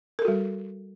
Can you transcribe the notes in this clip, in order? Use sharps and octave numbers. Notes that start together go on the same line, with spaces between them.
G3 F#4 A4 A#4